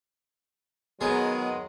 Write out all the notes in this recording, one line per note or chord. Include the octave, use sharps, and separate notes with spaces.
D#3 F#3 G#3 B3 G#4